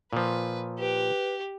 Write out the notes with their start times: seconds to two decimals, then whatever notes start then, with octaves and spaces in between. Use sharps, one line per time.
0.13 A#2 F3 B4
0.79 G4 B4